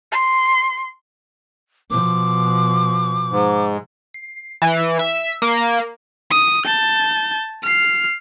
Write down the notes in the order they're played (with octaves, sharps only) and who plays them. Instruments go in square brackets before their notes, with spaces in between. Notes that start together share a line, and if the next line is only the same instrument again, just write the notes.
[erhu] C6
[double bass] B2 F3 [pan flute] D6
[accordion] G#2
[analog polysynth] C7
E3
E5
A#3
[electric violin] D#6
A5 G6
F6 C7